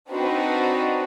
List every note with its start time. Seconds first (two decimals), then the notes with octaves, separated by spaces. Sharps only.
0.10 C4 D4 D#4 F#4 B4